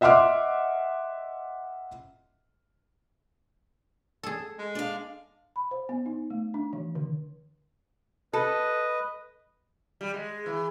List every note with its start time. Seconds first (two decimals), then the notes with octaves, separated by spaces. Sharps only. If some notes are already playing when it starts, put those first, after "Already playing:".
0.01 D#5 E5 F#5 C6 D6 F6
4.23 G#4 A4
4.59 G#3
4.75 D4 F5
5.56 B5
5.71 C5
5.89 B3
6.06 D#4
6.30 A3
6.54 D4
6.73 E3
6.95 D3
8.33 A4 B4 D#5
10.01 G3
10.14 G#3
10.46 E3